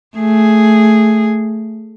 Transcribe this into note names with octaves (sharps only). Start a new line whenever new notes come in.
A3 G#4